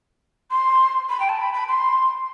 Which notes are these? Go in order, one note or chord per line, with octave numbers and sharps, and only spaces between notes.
C6
B5
G5
A5
B5
B5
C6